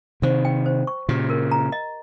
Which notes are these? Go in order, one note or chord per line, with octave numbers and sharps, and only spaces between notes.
C3 D#3 C5
G5
C5
C#6
A#2 C#3 G4
A#4
A#5
D#5